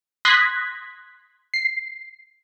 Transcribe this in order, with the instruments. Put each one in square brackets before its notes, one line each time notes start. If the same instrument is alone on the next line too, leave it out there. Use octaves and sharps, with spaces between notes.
[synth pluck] C6 D#6 F#6 G#6 A#6 B6
C7